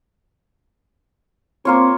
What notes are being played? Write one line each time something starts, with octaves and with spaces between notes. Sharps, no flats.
A#3 C4 F4 C#5